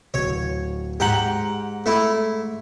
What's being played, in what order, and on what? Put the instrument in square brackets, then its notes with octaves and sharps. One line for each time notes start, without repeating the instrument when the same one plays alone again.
[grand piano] D1 [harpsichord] C#5
[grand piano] G#2 A#5 F#7 [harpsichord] G4 F#5
[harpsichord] A3 E4